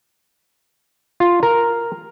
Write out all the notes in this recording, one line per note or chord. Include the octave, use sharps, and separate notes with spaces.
F4
A#4